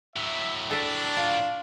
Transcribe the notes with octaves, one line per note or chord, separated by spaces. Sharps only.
A2 F#3 E5
D4 A4 E5
F4